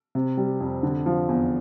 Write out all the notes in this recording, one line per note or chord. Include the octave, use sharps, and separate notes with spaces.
C3
G3
F2
D3
F3
E2